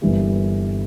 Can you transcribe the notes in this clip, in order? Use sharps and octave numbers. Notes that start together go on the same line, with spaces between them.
G1 G2 E3 G3 A#3